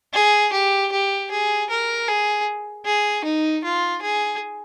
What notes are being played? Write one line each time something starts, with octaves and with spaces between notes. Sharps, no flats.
G#4
G4
G4
G#4
A#4
G#4
G#4
D#4
F4
G#4